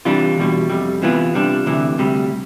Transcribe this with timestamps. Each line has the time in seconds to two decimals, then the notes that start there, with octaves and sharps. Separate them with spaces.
0.05 C3 E3 G3 D4 F4
0.38 E2 B2 G3
0.70 F2 C3 G3
1.02 C3 E3 B3 F4
1.34 C2 C3 G3 D4
1.66 D2 C3 E3
1.98 D2 C3 G3